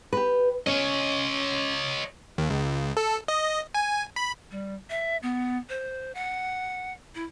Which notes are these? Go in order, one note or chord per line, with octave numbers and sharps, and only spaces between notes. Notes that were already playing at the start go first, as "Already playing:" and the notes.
G4 B4
C#4 C#5 D#5
D#2
C#2
A4
D#5
G#5
B5
G3
E5
B3
C5
F#5
E4